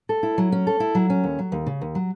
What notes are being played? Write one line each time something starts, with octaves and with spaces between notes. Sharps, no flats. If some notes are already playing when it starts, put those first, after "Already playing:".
A4
E4
F#3
C#4
A4
E4
F#3
C#4
D#2
F#3
D#2
C#3
D#2
F#3